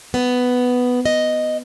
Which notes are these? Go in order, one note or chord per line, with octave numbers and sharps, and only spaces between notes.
B3
D#5